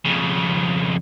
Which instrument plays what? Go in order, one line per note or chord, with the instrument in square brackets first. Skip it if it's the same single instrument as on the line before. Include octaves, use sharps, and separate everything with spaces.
[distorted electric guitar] F2 C#3